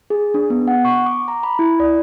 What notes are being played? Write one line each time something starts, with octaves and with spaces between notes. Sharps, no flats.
G#4
D4
B3
F#5
C#6
D6
A#5
B5
E4
D5